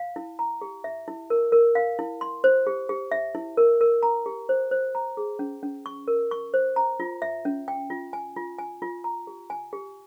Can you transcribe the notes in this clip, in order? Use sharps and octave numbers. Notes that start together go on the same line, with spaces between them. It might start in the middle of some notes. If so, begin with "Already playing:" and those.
Already playing: F5
E4
A#5
G4
E5
E4
A#4
A#4
F5
E4
C6
C5
G4
G4
E5
E4
A#4
A#4
A#5
G4
C5
C5
A#5
G#4
C#4
C#4
C#6
A#4
C#6
C5
A#5
F4
E5
C#4
G5
F4
G#5
F4
G#5
F4
A#5
G4
G#5
G4